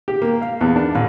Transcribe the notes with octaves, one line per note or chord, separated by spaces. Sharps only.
G4
A#3
F5
E2
D4
A1